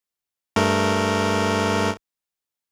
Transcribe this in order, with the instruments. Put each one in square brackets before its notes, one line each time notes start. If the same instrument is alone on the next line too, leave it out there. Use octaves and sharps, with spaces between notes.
[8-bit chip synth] G2 A3 A#4